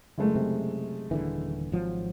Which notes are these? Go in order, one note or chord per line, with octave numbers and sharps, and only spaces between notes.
F#1 G#3 A3
C3
D#1 D3 E3
G#1 F3 F#3